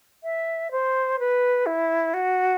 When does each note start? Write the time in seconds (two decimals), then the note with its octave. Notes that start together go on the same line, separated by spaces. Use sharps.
0.24 E5
0.71 C5
1.19 B4
1.66 E4
2.14 F#4